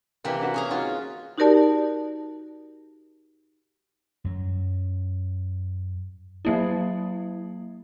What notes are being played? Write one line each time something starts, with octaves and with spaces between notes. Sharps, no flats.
C3 E3 A#3 E4 G4
D4 F#4 B4
C#4 G#4 A#5
D#4 F4 F#4
D#4 F#4 G4 A#4 D5 A5
F#2 F#3
F#3 A#3 E4